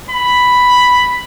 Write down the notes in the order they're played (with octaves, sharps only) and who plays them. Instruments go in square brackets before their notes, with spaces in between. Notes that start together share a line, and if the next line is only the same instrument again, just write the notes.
[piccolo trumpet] B5